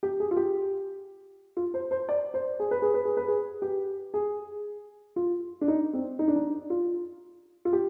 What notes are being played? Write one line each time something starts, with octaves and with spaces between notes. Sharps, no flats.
G4
G#4
F4
G4
F4
C5
C5
D5
C5
G#4
B4
G#4
B4
G#4
B4
G#4
G4
G#4
F4
D4
D#4
C4
D#4
D4
D#4
F4
F4
G4